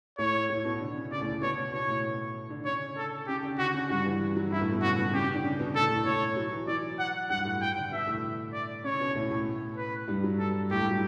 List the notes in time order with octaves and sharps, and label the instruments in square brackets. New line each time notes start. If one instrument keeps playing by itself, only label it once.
[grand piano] A2 A3 [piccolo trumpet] C#5
[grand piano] A2 A3
B2 B3
D3 D4
C#3 C#4
[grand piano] C#3 C#4 [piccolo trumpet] D5
[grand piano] A2 A3
A2 A3
[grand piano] B2 B3 [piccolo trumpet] C#5
[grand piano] C#3 C#4
[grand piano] B2 B3 [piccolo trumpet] C#5
[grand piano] A2 A3
D3 D4
[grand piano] C#3 C#4 [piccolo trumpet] C#5
[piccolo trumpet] A4
[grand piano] C#3 C#4 [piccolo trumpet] G4
[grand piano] D3 D4
[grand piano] D3 D4 [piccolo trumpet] F#4
[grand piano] C#3 C#4
[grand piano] G2 G3 [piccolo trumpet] F#4
[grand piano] E3
E3
F#3
[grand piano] G2 G3 [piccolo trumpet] E4
[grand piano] A2 A3
B2 B3
[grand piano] C#3 C#4 [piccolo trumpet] F#4
[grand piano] B2 B3
[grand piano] C#3 C#4 [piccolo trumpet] G4
[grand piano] C#3 C#4
D3 D4
C#3 C#4
B2 B3
[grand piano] A2 A3 [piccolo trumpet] A4
[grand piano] A2 A3
[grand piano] A2 A3 [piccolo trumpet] C#5
[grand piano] F#3
E3
[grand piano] F#3 [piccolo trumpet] D5
[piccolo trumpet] F#5
[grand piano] G2 G3 [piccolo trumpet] F#5
[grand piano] A2 A3
[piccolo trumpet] G5
[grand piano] D3 D4
[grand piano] B2 B3 [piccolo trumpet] E5
[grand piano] A2 A3
[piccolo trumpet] D5
[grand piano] C#3 C#4 [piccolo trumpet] C#5
[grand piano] B2 B3
A2 A3
A2 A3
[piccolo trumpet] B4
[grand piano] G2 G3
F#3
[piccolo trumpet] A4
[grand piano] A2 A3 [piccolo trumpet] G4
[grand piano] G2 G3
F#3